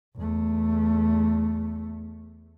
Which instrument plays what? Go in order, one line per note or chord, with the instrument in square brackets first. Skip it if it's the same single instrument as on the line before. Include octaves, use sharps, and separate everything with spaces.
[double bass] E2 A3